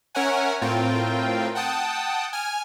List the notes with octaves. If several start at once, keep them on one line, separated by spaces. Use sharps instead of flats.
C#4 A#4 C#5 E5 F#5 G#5
A2 C4 F4 A#4 G5
F#5 G5 A5 D#6
G#5 F6